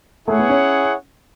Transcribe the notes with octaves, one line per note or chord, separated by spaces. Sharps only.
A3 E4 G#4 C#5 F#5
B3
C#4